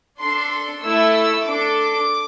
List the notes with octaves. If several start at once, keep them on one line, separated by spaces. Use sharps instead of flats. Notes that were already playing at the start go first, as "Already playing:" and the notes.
D4 A4 C6
C6
A3 E4 A4 E6
E6
D4 A4 D6